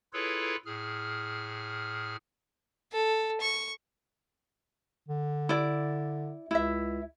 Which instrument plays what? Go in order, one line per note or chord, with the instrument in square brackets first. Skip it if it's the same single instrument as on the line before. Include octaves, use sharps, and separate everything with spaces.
[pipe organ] E4 F4 G#4 A4 B4 C#5
A2 G#4 F6
[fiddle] A4
C#6
[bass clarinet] D3
[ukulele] E4 D5
[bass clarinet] C#2 [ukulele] E4 E5